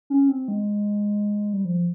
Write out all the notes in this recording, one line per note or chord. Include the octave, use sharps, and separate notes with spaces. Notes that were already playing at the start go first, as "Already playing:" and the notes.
C#4
C4
G#3
G3
F3